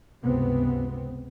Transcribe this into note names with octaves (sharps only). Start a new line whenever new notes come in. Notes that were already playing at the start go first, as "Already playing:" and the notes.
C#2 G2 C3 B3 C4